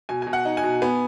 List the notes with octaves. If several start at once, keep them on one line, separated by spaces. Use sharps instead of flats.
B2 G#5
B2 G#5
F#5
D#4
G#5
B2
B3 G#5